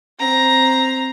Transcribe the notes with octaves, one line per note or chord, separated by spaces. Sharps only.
C4 A#5